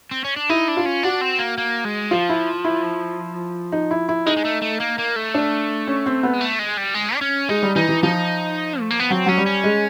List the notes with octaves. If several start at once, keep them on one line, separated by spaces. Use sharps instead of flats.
C4
C#4
D4
D#4 E4
D4
F4
C#4
D4 F#4
C4
A#3
A#3
G#3
F3 F4
E4
E4
D#4
E4
E4
G#3 D#4
G#3
A3
A3
A#3
A#3
A3
D4
C#4
C4
B3
G#3
A3
G#3
G3
G#3
D4
C#4
G#3 D#4
G3
E3 D#4
E3
F3 D#4
A3
A#3
B3
F#3 C4
F#3 C#4
G3
C#4
G#3